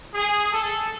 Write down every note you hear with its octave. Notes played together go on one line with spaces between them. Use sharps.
G#4
A4